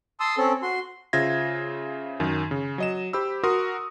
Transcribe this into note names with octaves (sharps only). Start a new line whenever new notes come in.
A5 C6 D#6 E6
C4 C#4 A4
F#4 C6
C#3 F4 C5 E5 G#6 A#6
F#2 D#3
C#3
F#3 D#5 E7
G4 C5 B5 E6
F#4 A#4 C6 D#6